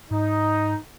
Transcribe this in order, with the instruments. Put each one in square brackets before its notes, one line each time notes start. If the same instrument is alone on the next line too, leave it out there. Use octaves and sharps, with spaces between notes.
[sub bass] G#2 [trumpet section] D#4